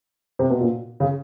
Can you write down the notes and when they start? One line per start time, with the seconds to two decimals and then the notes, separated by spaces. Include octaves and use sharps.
0.39 C3
0.50 B2
0.61 A#2
1.00 C#3